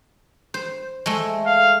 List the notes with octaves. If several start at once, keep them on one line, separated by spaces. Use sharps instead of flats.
C5
G#3 A3
F5